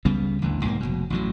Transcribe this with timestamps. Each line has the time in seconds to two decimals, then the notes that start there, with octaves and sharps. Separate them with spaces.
0.05 C#2 C#3 G3 B3
0.42 A1 D#2 D3
0.63 B1 G#2 F3 A#3
0.80 F1 C#2 B2
1.10 A1 A2 F#3